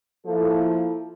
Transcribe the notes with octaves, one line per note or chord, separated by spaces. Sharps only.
F3 A#3 E4 A4